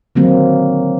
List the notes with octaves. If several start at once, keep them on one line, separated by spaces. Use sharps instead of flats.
D3 D#3 F#3 A#3 C4